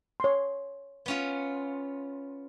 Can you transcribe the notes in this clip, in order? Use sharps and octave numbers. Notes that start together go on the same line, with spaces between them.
C#5 C6
B3 C#4 F4